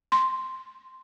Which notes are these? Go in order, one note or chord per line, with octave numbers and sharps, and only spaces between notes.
C6